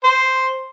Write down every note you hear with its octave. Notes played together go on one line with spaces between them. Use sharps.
C5